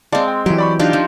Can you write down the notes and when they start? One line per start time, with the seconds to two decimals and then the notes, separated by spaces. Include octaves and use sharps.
0.12 G#3 C4 D5 F5 A5
0.28 G5
0.46 E3 F#3 G4
0.58 D5 B5 C#6
0.79 D4 D#4 F4 G4
0.93 F3